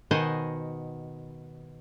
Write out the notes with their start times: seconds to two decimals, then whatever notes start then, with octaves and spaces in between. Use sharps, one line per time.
0.11 B2 D#3 C5 D#5 F#5 G#5